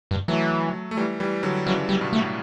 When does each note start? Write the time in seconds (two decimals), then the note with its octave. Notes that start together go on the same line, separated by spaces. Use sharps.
0.11 G2
0.28 E3 F#3 A3
0.91 A3
0.97 E3 G3
1.20 E3 G3
1.43 D3 F#3
1.67 C#3 E3 F#3
1.89 G3
2.01 G2 B2
2.13 A3
2.19 A2